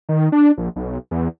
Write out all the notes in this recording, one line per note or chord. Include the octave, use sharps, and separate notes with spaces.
D#3
D4
A#1
B1
E2